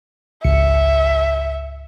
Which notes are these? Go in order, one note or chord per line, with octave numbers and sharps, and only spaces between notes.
G#1 C#2 E5 C#7